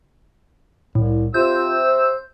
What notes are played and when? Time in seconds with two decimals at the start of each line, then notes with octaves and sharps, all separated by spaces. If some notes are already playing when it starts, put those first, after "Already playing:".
0.95 C2 A2
1.34 C3 F4 E6 G6
1.83 C5